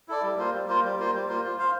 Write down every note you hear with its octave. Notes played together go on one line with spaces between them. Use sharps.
E4 A4 D5
G3
A#3 F4 C5
G3
A#3 F4 C5
G3
A#3 F4 C5
G3
A#3 F4 C5
F4
C5 F5